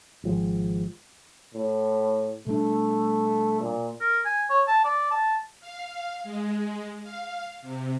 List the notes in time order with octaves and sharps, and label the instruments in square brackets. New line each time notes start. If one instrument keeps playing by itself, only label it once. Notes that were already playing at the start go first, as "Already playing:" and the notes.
[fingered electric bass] G#1 F3 G#3
[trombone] A2
[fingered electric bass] B2 G3 D4 [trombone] A3
[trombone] A#2
[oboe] A#4
G#5
C#5
A5
D5
A5
[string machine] F5
G#3
F5
C3